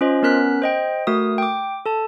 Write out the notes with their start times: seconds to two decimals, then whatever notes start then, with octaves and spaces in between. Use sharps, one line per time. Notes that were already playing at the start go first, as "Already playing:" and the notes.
0.01 C#4 F4 C5 D#5
0.23 B3 C#4 A#4 F#6 B6
0.62 C5 D#5 G5
1.07 A3 F#4 A#4 D#6
1.38 G5 D6
1.86 A4 A5